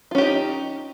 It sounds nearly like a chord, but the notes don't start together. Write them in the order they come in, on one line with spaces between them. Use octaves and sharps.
F4 C#4 G4 D#4